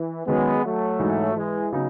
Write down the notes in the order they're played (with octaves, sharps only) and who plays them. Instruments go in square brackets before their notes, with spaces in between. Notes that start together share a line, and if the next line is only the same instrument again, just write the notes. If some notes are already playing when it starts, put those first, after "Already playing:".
Already playing: [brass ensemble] E3
[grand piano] D#3 F#3 C#4 [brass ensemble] G#3 B3
[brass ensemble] F#3 A3
[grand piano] G#2 E3 G#3 D#4 F#4
[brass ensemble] E3 G#3
[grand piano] C#3 F#3 B3 D#4